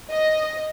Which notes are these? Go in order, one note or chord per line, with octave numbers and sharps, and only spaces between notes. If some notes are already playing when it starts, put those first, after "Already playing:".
D#5